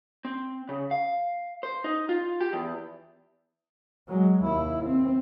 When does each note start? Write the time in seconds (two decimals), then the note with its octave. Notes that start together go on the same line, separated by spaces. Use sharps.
0.25 C4
0.69 C#3
0.91 F5
1.63 C5
1.84 D#4
2.09 F4
2.40 G4
2.53 E2
4.08 F#3 G#3
4.43 D#2 E4
4.86 C4